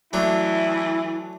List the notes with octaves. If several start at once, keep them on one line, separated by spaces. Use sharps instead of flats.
E3 F#3 A3 D4 E4